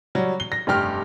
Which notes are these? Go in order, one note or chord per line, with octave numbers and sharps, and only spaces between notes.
F#3 G3
G7
A#6
F1 G2 G4 F6